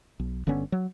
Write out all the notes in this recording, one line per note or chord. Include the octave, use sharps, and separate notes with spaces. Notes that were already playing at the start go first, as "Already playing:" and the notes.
B1
G1 D3 B3 C#4
F#3